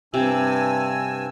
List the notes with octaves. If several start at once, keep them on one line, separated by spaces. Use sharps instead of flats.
G2 C3 G#5 E6